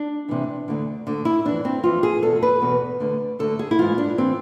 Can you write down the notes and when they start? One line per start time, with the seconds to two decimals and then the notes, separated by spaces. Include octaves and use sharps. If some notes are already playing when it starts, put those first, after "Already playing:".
Already playing: D4
0.29 E2 C3 E3
0.68 D2 D3
1.07 D2 D3
1.25 E4
1.45 F2 E3 D4
1.65 C4
1.84 F2 E3 F4
2.03 G#4
2.23 E2 B2 A4
2.43 B4
2.62 E2 B2
3.00 D2 D3
3.39 D2 D3 A4
3.59 G#4
3.71 E4
3.78 G#2 E3 F4
3.98 D4
4.18 E3 C4